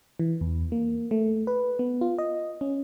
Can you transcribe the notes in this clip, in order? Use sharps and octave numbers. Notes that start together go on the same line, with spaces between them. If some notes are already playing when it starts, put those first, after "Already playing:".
E3
E2
A#3
A3
B4
B3
F4
D#5
C#4